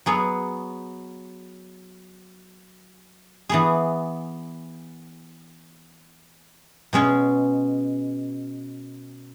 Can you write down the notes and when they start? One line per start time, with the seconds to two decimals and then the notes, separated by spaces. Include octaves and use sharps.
0.06 F#3 B3 G#4 C#5
3.49 E3 B3 G#4
6.93 B2 G#3 C#4 G#4